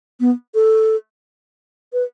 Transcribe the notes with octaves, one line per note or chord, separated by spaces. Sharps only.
B3
A4
B4